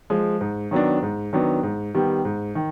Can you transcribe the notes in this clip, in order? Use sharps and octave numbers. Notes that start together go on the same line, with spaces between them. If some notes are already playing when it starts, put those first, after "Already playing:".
F3 G#3
G#2
D#3 F#3 B3 D4
G#2
D#3 F#3 B3 D4
G#2
D#3 G3 B3
G#2
D#3